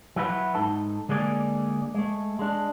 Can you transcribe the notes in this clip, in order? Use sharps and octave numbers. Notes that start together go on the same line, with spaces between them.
F#3 E4 F#4 B4
G#2 D#4 A4 A5
D3 G#3 A#3 G#4 D5
G#3 A3
G#3 D4